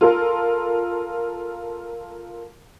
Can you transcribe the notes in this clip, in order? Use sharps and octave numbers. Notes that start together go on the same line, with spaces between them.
F4 A4 A#4